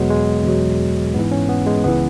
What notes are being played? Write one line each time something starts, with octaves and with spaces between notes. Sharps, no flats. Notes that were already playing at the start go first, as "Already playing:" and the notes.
Already playing: E2 B2 F#3 G#3 B3
G#3
E2 B2 F#3
G#2 E3 B3
C#4
B3
G#3
C#2 C#3 E3 B3